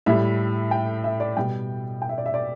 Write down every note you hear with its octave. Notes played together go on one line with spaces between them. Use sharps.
A2 G3 E5
G5
E5
D5
B2 G3 G5
G5
E5
D5
E5
D5